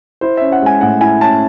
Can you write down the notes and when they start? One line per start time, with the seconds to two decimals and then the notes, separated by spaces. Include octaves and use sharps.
0.21 E4 C5
0.37 C#4 E5
0.52 F#5
0.62 G#3 G#5
0.81 A2 F#5
1.01 E4 G#5
1.21 C#4 A5